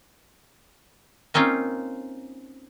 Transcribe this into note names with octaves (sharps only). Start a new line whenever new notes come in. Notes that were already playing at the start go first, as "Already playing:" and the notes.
A#3 C4 C#4 D#4 F4